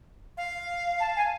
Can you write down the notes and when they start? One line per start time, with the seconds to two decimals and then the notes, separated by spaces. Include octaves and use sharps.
0.37 F5
1.00 A5
1.16 G#5